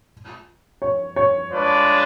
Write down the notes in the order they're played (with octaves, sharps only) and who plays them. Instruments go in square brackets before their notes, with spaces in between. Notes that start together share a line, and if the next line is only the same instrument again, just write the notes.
[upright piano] C#5
C#5
[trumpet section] G#3 D4 F4 B4 D5